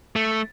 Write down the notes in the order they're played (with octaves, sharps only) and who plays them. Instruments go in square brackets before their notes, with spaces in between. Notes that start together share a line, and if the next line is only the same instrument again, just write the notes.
[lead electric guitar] A3